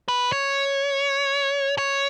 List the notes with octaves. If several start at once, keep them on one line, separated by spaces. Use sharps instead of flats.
B4
C#5
C#5